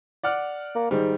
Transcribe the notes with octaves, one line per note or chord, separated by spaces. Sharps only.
D5 F#5 F6
A#3
G#2 D#3 G3